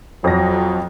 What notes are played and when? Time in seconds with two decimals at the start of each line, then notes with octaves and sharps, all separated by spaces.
0.24 F2 F3 F#3 A#6